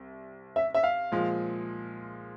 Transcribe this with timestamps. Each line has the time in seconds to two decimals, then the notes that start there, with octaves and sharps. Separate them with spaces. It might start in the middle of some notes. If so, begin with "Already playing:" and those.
Already playing: C2
0.56 E5
0.74 E5
0.83 F5
1.12 A#2 F3 G#3